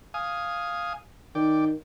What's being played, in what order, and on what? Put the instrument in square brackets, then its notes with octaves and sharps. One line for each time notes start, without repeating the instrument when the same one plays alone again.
[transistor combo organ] F5 G#5 D#6
[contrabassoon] D#3 [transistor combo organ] D5 G5